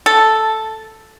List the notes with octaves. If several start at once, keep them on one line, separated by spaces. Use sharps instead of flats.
A4